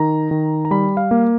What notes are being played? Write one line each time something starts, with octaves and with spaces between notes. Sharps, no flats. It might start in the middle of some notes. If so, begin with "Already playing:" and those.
Already playing: D#3 A#5
D#3
A#5
G3 B5
F5
A#3